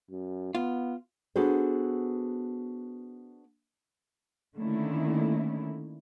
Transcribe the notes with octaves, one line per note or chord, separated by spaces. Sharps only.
F#2
B3 F4
B3 D4 F#4 G#4 A4 C5
D3 D#3 A3 A#3 C#4 E4